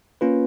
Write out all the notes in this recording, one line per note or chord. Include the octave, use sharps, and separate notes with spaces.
A#3 C#4 F4 B4